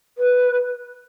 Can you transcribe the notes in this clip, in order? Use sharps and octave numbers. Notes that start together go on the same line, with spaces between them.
B4